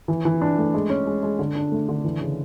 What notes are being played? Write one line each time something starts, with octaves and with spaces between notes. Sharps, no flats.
E3
E3
D4
A3
G#3
C#4
G#3
G#3
D3
D4
A3
D3
E3
C#3